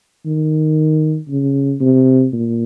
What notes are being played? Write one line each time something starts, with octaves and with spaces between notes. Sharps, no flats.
D#3
C#3
C3
A#2